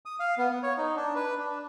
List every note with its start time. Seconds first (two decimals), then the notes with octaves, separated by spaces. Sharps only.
0.06 D#6
0.20 F5
0.38 B3
0.50 B3
0.63 C#5
0.78 D#4
0.96 D4
1.15 B4
1.38 D4